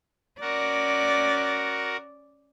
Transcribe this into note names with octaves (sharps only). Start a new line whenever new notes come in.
C#4 F#4 A#4 D5 F#5